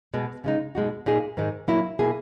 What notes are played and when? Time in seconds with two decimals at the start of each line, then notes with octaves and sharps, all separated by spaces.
0.14 B2 G#3 B3
0.44 C#3 G#3 D#4
0.75 B2 G#3 D#4 F#4
1.06 A#2 G#3 D#4 G#4
1.37 G#2 D#3 G#3
1.68 A#2 F#3 A#3 E4
1.99 B2 A#3 E4 G#4